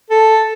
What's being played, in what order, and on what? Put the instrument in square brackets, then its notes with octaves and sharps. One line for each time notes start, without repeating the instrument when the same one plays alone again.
[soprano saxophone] A4